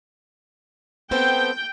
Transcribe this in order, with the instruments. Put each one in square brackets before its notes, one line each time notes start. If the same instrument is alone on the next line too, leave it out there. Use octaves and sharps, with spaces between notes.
[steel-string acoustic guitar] B3 C4 A4 [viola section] G5